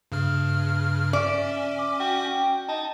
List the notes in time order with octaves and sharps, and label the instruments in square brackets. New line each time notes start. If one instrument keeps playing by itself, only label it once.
[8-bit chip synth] G2 C#3 F6
[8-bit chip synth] C#4 [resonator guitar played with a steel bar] D5 [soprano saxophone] E5
[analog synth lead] D6
[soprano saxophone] F#4 [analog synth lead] G5
[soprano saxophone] D#4 [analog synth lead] A5